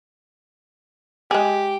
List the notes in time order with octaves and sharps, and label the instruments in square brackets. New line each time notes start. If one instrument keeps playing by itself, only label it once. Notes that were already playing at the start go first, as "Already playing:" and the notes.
[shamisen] G#3 G#4 [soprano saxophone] G4